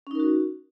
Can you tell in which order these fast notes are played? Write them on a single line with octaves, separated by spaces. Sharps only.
C#4 D#4 A#4 F#4